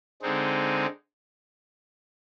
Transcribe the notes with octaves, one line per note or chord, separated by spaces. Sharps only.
D3 G#3 C4 D#4